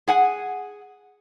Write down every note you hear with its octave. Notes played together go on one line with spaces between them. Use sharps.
G#4 F#5 G#5